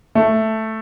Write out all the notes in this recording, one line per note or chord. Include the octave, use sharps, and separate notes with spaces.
A3